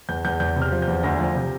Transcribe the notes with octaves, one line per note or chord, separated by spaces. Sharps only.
E2 G6
E2 G6
E2 G6
C3
F6
F3
G6
E2
D2 A#6
F3
C3